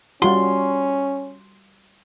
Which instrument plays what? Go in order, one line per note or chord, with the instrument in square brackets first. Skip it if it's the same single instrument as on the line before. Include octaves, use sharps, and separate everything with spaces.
[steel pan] G3 F4 F#4 [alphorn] C#4 [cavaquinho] C6